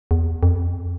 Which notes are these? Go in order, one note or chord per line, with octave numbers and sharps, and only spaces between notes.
E2
F2